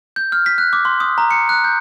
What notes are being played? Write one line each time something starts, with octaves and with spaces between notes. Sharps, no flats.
G6
F6
B6
F#6
D6
C6
D#6
A#5
C#7
F#6
G6